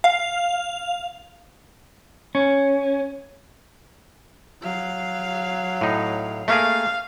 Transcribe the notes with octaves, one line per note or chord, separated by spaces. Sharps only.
F5
C#4
F#3 F5
A2 D#4
A3 A#3 G#4 F5